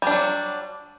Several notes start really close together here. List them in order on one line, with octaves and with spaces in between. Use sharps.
G3 D4 F#3